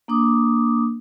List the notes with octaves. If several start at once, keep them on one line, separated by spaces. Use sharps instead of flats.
A#3 D4 D6 D#6